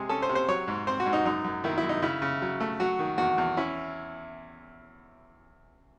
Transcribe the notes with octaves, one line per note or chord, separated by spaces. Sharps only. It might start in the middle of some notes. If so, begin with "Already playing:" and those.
Already playing: C3 G#3 G#4
C#4 A4
C5
C3
C5
F#3 C#5
G#2
C4 C5
F#4
G#2
D#4
F#2 D#4
F#2
D#3 E4
E4
F#2
D#4
C#3 E4
C#3
F#3
A3
F#3 F#4
D#3
E2 F#4
E2
C#4 E4